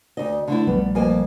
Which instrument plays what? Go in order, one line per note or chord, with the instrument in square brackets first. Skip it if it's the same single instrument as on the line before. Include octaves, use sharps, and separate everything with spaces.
[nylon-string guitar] D2 D#5
D3 A3 E4
[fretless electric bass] A#1 G3 A3 [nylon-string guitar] B3
[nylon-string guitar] F2 A#3 G#5